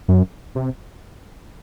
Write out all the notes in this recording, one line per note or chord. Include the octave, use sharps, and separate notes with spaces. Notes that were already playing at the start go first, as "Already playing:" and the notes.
F#2
C3